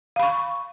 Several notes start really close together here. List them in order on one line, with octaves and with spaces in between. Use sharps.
F5 B5 C#6